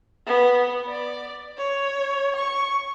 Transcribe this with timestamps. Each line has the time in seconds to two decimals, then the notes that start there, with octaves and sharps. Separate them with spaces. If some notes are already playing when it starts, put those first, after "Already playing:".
0.27 B3
0.89 D5
1.58 C#5
2.36 C#6